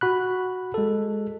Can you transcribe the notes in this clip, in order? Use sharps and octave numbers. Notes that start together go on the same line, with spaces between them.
F#4 B5 F#6
G#3 A4